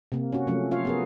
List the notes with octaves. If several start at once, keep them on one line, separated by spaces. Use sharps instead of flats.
C3 A#3
C#4 F#4
C3 F3 F#3 A3 C#4
F4 C#5 F5
B3 G#4 A#4